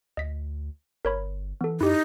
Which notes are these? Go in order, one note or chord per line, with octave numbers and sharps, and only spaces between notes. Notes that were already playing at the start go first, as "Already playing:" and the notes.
D2 D#5 B6
G1 A#4 C#5 B5
E3 B3 A4
F#2 D#4 E4 G4